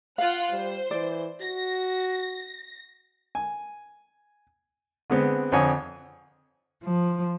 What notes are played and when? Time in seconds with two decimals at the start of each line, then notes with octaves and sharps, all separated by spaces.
0.18 F4 F5 F#5 F#6
0.50 G3 C5
0.91 E3 D5
1.41 F#4 A#6
3.35 G#5
5.10 D3 G#3 B3 C4
5.52 F2 D3 C4 C#5 G#5 D#6
6.83 F3